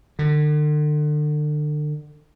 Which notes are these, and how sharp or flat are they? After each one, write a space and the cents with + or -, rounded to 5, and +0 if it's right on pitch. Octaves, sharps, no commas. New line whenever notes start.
D3 +35